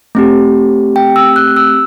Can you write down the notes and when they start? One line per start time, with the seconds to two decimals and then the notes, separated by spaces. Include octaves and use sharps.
0.15 A3 C4 G4
0.96 G5
1.16 E6
1.36 F#6
1.56 E6